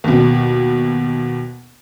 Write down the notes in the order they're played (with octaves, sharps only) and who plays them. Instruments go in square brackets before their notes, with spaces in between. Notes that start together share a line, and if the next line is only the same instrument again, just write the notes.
[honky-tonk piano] D#2 B2